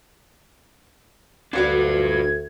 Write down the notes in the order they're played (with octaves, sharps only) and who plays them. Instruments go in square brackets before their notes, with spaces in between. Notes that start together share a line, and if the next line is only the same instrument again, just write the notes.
[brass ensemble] D2 [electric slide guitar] D4 B4 [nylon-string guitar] F4 F#4 D5 [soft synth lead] G#6